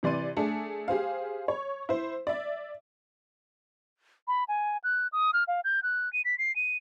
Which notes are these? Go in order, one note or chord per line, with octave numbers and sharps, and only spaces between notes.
C3 E3 D5 C6 D#7
A3 D4 G#4
G4 G#4 C5 F5
C#5
E4 C5
D5 E5
B5
G#5
F#6
D#6
F6
F5
G6
F#6
D#7
B6
C7
D#7